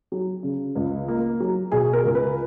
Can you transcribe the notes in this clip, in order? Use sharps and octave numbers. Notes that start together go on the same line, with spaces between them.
F#3
C#3
C#2
A#3
F#3
B2 G#4
A#4
C#2
B4